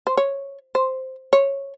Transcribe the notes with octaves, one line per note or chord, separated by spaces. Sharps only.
C5
C#5
C5
C#5